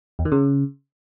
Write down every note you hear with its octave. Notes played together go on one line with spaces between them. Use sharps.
E2
D#3
C#3